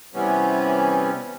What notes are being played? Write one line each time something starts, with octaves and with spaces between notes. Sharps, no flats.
C3 E3 G3 B3 C#4